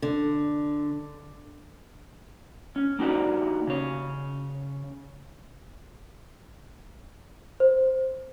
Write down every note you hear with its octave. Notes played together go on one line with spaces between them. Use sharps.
D3
C#4
A#3 D#4 F#4 G4 D5
C#3 C#5
C5